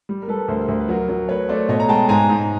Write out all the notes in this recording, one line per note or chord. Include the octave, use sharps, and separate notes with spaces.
G3
A#4
G3 A4 B4
D2 A#4 C5
D2 A#4
B4
F#3 A#4
F#3
A3 B4 C#5
A3 C5 D5
B2 C#5 D#5
A#5
G#3 G5 A5
G#2 G#5 A#5
G#2